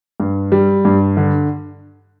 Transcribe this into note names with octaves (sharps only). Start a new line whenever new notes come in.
G2
G3
G2
D3